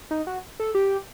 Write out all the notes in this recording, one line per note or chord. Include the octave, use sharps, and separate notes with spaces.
D#4
F#4
A4
G4